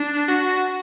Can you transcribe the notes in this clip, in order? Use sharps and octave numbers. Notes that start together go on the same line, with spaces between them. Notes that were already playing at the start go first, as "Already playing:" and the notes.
Already playing: D4
F#4